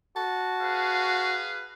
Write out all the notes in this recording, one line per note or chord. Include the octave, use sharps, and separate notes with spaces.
F#4 A5
G#4 B4 F5